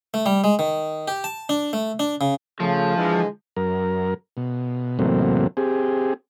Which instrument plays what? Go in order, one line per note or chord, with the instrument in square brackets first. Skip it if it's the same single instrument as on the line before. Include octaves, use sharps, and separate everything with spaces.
[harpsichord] A3
G3
G#3
D#3
G4
A5
D4
A3
D4
C#3
[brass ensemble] C#3 A3 [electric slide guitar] F3
[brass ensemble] D3 E3 G#3
[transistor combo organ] F#2 A#4
B2
E2 A2 C3 F#3 A#3 C4
C4 G4 G#4